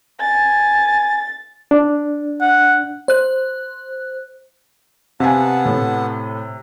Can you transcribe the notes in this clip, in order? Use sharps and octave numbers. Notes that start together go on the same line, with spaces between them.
G#5 A6
D4
F#5
C5 F#6
C3 B3 F5 F#5 G#5 A5
A2